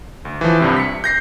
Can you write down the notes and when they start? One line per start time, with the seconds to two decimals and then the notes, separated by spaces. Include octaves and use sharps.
0.25 D2
0.41 E3 F3
0.60 C2 G2 C3
0.77 B6 C#7
1.04 G6 A#6 C7